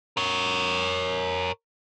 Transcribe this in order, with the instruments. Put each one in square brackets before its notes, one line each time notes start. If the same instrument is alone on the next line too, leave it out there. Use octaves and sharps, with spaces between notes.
[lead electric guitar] A#4 C#5